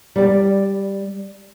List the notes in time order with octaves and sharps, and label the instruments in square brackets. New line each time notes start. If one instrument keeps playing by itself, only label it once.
[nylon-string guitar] G3 D5